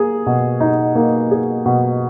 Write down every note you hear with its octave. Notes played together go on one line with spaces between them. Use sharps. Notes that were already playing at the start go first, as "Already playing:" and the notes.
Already playing: A#3 G#4
B2
D#4
A#3
G#4
B2